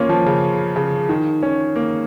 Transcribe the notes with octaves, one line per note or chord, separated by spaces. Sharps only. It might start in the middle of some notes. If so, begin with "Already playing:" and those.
Already playing: A#3 C#4 F4
F3
C#3
C#3
D#3
C#4
A#3